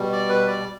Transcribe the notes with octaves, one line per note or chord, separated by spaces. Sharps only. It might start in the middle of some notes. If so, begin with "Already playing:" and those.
Already playing: B2 G3
D5
B4
D5